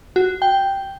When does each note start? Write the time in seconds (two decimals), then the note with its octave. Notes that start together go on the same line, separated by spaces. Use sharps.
0.16 F#4
0.42 G5